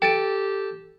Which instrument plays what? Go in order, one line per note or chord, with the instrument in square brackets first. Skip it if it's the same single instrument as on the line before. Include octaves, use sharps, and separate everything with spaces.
[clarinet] G4 [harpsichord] A4 [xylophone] G5 A6 D7